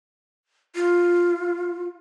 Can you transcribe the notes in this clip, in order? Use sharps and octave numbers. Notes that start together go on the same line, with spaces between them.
F4